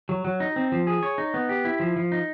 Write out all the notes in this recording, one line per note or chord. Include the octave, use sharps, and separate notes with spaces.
F#3
F#3
D#4
C4
F3
G#4
C#5
D#4
B3
G4
E4
F3
F3
D#4